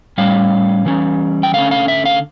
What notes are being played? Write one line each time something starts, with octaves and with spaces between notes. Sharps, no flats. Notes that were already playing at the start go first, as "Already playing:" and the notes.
A2 G3 C#4 F5
E3 G3 C#4
G5
D3 A3 C#4 F5
F5
E5
F5